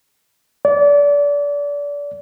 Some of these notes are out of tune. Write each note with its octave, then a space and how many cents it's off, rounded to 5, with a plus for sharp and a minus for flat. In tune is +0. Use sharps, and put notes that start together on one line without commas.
D5 -30